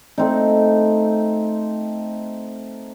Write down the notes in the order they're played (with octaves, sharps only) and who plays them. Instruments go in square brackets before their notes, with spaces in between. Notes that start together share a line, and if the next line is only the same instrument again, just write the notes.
[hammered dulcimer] A3 C4 D#4